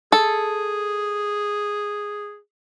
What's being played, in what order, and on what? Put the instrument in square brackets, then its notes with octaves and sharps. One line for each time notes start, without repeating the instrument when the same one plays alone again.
[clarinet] G#4 [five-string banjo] A4